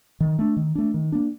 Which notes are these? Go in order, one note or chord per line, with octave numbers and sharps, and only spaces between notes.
D#3
A3 D4
D#3
A3 D4
D#3
A#3 D4